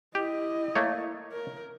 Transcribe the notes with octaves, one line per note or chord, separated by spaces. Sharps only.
E4 G4 D#5
A3 A#3 C#5
A#4